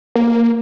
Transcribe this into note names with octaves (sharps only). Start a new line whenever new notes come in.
A#3